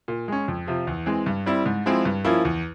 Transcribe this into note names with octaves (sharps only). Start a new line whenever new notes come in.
A#2
G#3 C#4
F2
C3 F3
E2
E3 G#3 C4
G2
G3 C4 E4
G#2
F3 G#3 C4 E4
G2
F3 A#3 C#4 E4
E2